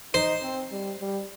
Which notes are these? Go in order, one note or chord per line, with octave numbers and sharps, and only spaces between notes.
D#4 C5
C4
G3
G3